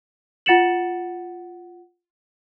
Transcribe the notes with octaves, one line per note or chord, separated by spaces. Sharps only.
F4 F#5 A6 C#7 E7 F#7